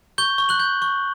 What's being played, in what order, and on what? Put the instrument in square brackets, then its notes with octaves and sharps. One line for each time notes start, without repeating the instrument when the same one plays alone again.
[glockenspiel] C#6 G6 G7
C#6
F#6 F#7
G6
C#6